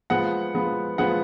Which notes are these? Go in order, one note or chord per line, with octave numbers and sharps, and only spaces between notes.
F3 G#3 B3 F#5
F3 G#3 B3
F3 G#3 B3 F#5